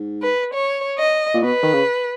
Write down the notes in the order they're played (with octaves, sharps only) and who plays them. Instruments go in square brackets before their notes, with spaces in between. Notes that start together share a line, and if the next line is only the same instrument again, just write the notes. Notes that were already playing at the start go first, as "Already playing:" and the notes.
Already playing: [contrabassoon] G#2
[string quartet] B4
C#5
D#5
[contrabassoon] A#2
[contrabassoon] B2 [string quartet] B4
[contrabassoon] D#3
C#3